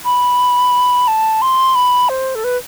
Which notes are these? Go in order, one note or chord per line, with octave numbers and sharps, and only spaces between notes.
B5
A5
C6
B5
C5
A4
B4